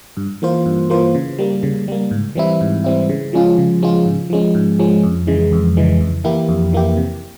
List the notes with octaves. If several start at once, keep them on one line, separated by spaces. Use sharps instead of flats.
G2
E3 A#3 F4 C5
G2
E3 A#3 F4 C5
C#3
G3 A#3
C#3
G3 A#3
G#2
E3 G3 C4 E4
G#2
E3 G3 C4 E4
C#3
F3 G#3 C#4 F4
C#3
F3 G#3 C#4 F4
G#2
F3 G#3 C#4
G#2
F3 G#3 C#4
F2
C#3 E3 G#3
F2
C#3 E3 G#3
F2
E3 A#3 E4 G4
F2
E3 A#3 E4 G4
C3